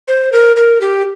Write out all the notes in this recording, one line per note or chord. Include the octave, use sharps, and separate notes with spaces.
C5
A#4
A#4
G4